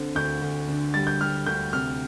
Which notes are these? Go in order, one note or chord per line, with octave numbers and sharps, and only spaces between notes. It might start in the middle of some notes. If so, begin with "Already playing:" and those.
Already playing: D3 C4
D2 G6
D2
D3
G3 A6
G6
G3 F6
D2 G6
C3 F6